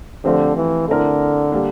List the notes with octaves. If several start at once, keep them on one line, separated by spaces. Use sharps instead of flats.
D3 F3 A3 C4 G4 C5
E3
D3 A3 C4 E4 A#4
G3 A#3 D4